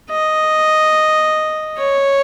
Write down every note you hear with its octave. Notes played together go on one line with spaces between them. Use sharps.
D#5
C#5